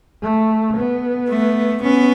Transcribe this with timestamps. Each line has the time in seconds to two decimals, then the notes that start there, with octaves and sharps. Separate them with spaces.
0.22 A3
0.76 B3
1.29 A3
1.83 B3 C#4